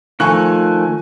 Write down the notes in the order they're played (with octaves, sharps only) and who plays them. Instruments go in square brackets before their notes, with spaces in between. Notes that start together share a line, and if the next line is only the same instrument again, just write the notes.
[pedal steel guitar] D#3 F3 A3 [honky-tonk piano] G#5 C#6 F#6